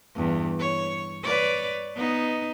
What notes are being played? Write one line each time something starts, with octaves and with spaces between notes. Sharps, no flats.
E2 G2
C#5
B4 C#5 D5
B3 D#4